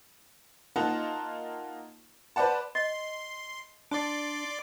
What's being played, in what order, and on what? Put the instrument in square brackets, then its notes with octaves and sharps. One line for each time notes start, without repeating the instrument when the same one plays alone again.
[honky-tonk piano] A#3 D#4 F4 D#5 F#5 A5
B4 C5 D5 F#5 A5
[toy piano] D#5 [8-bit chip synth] C6
[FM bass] D4 [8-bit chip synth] D5 C6 D6